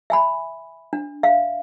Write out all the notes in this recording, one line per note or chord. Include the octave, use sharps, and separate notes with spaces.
E5 G#5 B5
D4
E5 F5